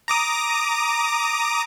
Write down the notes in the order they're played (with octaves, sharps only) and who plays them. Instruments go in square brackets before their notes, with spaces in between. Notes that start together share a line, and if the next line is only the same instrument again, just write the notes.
[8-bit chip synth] A#5 D6 D#6